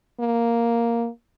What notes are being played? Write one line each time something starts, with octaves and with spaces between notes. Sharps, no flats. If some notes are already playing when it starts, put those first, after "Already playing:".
A#3